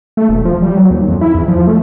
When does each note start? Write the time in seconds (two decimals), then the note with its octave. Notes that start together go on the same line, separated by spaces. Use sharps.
0.17 A3
0.29 E1
0.45 F3
0.62 G3
0.76 F#3
0.91 D#2
1.08 F2
1.21 E4
1.35 E2
1.48 F3
1.67 A3